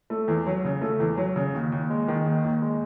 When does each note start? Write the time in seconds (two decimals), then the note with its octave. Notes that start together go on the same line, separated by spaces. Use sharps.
0.10 A3
0.28 E2
0.47 F#3
0.65 C#3
0.82 A3
1.00 E2
1.18 F#3
1.36 C#3
1.55 D#2
1.72 D#2
1.90 G#3
2.08 D#3
2.26 D#2
2.44 D#2
2.62 G#3